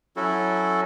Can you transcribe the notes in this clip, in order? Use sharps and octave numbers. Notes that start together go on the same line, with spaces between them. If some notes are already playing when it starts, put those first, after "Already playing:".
F#3 C#4 E4 F#4 A4